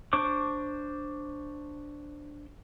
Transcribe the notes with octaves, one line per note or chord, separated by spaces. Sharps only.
D4 C5 C#6 D6